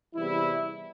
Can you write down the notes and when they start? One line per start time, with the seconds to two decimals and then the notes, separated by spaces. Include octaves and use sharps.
0.14 E2 C3 E3 G3 E4